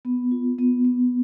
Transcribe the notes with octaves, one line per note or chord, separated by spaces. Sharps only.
B3
F4
B3
B3